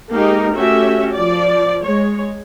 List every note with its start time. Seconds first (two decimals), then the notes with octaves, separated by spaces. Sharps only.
0.12 G#3 A#3 D#4 G4 A#4
0.54 A3 C#4 F#4 G4 E5
1.14 F3 D5
1.84 G#3 C#5